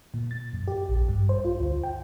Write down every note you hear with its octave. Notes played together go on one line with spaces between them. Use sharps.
A#2
A6
F#2
G4
A#1
G2
C5
F4
D2
G5